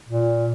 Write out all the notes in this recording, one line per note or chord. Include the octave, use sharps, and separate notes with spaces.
A#2